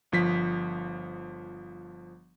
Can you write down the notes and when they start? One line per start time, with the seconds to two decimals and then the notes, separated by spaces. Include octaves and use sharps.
0.12 G1 F3 B6